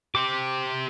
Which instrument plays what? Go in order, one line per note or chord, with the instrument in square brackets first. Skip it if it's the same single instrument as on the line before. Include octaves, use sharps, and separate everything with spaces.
[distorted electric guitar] G4 C5 [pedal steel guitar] D6